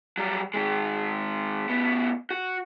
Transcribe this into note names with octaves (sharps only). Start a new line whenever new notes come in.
F#3 G3
D#3 G#3
A2 B3
F#4